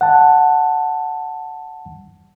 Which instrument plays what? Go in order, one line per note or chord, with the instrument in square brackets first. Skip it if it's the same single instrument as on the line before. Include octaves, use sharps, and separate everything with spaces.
[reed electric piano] F#5 A5